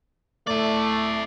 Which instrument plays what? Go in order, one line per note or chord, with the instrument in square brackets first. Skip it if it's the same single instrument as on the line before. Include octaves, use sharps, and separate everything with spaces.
[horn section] A3 [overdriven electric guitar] E4 D5